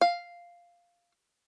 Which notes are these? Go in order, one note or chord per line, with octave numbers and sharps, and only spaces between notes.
F5